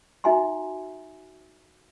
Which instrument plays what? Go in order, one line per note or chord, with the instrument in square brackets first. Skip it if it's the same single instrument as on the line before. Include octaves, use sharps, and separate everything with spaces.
[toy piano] D#4 F#4 E5 G#5 A#5 C6